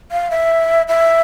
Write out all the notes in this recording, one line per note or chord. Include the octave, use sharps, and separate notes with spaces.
F5
E5
E5